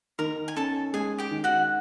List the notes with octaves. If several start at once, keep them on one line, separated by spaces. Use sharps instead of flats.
D#3 A#4 A#5
G#5
C#4 A4 A5
G#3 G#4 G#5
G4 G5
D#3
F#4 F#5